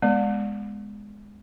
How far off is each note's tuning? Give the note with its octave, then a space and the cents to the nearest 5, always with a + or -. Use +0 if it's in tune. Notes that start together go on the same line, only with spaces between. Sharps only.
G#3 -5 B3 +0 D5 +0